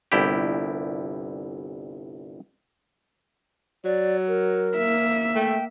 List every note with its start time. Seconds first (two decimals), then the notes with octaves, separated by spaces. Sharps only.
0.12 G1 C2 E4 G4
3.85 F#3 D5
4.28 A#4
4.76 A#3 E5
5.36 A3 G5